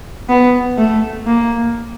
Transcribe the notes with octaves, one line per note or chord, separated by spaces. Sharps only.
B3
A3
A#3